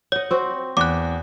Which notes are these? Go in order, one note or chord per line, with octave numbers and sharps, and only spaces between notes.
C#5 D#5 F#5
C4 F#4
E2 D6 F#6